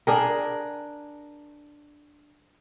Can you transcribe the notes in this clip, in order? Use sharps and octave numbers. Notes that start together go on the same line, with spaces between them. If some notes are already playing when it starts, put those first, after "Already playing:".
D4 G#4 A#4